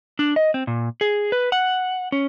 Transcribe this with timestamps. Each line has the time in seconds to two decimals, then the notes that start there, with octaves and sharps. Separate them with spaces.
0.19 D4
0.36 D#5
0.54 C4
0.67 A#2
1.01 G#4
1.32 B4
1.52 F#5
2.12 C#4